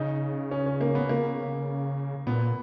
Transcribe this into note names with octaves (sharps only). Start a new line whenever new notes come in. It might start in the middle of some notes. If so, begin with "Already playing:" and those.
Already playing: C#3 D#4
C#4
C#4
A#3
B3
C#3 A#3
A#2 B3